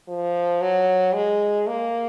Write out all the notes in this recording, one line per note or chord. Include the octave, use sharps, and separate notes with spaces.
F3
F#3
G#3
A#3